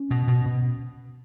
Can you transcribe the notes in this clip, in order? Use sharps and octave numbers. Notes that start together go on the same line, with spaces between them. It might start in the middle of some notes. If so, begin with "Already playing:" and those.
Already playing: C#4
B2
B2
B2